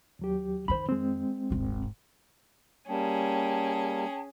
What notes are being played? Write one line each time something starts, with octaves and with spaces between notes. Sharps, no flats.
D#2 F#3 G4
F2 D#3 C5 B5
G#3 C4
D#1 G#1
G3 A#3 C#4 G#4 G5 A5